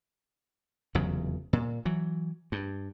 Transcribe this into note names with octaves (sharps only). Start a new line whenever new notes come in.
F1 E2 C#3 F#3
A#2
E3 F#3
G2